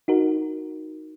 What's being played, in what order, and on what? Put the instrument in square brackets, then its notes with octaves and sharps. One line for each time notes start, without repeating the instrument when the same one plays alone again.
[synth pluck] D#4 F#4 A#4